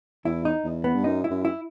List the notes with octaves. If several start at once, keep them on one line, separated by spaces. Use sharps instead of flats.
E2 E4
D#4
E2
B3
G2
F#2 D#4
E4
F#2
E4